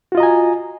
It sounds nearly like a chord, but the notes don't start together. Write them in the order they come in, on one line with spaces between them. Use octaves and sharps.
F#4 F4 D#5 A#5 G#5